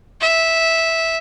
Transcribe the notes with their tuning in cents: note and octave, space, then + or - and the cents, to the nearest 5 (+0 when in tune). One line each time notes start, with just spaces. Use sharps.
E5 -10